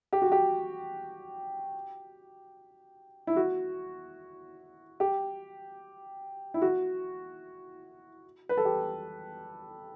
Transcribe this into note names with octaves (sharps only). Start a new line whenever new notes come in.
G4
F#4
G4
E4
F#4
G4
E4
F#4
B4
A4
G4